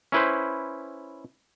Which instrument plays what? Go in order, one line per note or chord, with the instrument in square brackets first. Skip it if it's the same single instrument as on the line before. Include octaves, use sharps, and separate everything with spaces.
[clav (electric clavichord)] C#4 E4 B4 C5